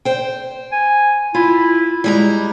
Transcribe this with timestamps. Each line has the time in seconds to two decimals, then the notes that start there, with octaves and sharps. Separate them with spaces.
0.05 C5 G5
0.72 G#5
1.35 E4 F4
2.04 G3 G#3 E4 A#5